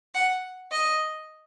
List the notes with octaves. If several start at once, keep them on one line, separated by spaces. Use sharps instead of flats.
F#5
D#5